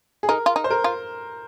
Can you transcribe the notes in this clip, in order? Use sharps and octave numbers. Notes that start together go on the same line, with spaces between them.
G#4
D#4 A#4
F4
D#4
C5
A#4
F4